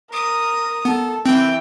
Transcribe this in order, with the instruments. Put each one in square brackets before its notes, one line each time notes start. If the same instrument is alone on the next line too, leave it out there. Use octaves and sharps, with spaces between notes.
[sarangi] A#4 [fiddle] D#6
[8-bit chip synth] B3 [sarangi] A4
[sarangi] E3 [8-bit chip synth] C4 [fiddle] G5